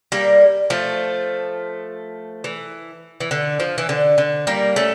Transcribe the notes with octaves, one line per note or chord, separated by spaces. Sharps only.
G3 A#3
F3 A3
E3
E3
D3
F3
E3
D3
D3
G3 A#3
A3 C#4